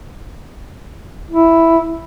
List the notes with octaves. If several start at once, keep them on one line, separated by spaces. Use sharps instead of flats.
E4